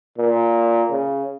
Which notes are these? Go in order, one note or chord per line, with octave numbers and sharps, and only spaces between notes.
A#2
C#3